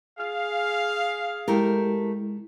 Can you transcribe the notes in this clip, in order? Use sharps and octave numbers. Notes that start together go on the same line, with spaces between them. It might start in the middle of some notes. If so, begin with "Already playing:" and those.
G#4 F5
G#3 A3 E4 G4 A#4